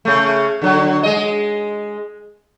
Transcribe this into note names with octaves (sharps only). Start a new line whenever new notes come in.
C#3 A3
D3 F#3
G#3 D#5